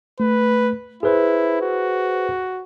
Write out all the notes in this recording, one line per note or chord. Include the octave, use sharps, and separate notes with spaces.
A3 B4
E4 G#4 B4 C5
F#4